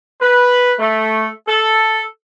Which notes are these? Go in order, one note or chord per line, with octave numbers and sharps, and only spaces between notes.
B4
A3
A4